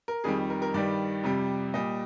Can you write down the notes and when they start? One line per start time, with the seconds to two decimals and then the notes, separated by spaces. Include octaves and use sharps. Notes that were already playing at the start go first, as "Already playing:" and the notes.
0.08 A#4
0.24 F2 D#3 G3 G#4
0.50 A#4
0.62 A#4
0.74 G2 D#3 G3 D5
1.24 F2 C3 G3
1.74 A#2 G3 D#5